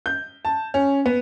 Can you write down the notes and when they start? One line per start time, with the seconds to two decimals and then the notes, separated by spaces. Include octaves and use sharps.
0.06 G6
0.45 A5
0.74 C#4
1.06 B3